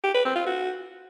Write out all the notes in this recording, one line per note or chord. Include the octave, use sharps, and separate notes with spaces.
G4
B4
C4
F4
F#4